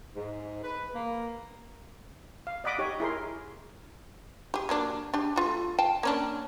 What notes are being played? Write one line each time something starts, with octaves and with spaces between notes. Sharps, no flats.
G#2
B4
A#3
F5
D5 D#5 F#5 B5 D6 D#6
D#4 G4 C#5
E4 G#4 A#4 C6
G4 G#4
F#3 A#3 D4
D4 G4 G#4
A3 F4 F#4
F5 G5 A5
A#3 C#4 D4